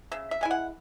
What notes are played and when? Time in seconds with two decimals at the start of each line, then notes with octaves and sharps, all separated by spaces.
0.12 C#3 E5
0.31 E5
0.41 G#3 E4 G#5
0.51 F#5